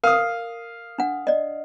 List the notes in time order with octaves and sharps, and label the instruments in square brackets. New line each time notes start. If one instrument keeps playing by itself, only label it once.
[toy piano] A#4 [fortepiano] F5 D#6
[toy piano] D4 F#5
D5 D#5